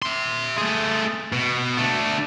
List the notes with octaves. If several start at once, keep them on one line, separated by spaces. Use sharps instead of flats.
E5 C6
A3 G#4
B2
D3 A3